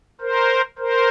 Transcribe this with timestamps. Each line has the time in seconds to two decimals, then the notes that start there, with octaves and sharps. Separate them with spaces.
0.21 A#4 C5
0.78 A#4 C5